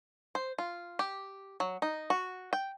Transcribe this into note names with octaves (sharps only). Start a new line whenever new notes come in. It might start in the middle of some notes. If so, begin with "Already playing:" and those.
C5
F4
G4
F#3
D#4
F#4
G5